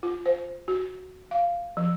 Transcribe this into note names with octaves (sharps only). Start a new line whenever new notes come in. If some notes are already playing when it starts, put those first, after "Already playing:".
F4
C5
F#4
F5
F3